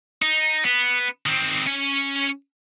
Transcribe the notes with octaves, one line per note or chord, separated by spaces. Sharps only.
D#4
B3
D#3 C4
C#4 G#5